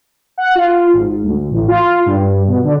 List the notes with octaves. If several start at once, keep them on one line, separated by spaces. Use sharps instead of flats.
F#5
F4
G#1
D2
A1
F4
G2
B2
D3